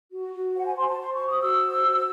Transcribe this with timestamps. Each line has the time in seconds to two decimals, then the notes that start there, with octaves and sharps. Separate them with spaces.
0.12 F#4
0.34 F#4
0.55 C5 F#5
0.66 G#5
0.76 C5 C6
0.88 A5
0.98 C5 C6
1.14 C#6
1.19 F#4
1.28 D#6
1.41 F#4 E6
1.63 C5
1.84 F#4